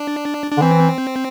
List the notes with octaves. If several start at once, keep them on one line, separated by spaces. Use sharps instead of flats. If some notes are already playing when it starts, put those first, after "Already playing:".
Already playing: D4
D4
D3
E3 C4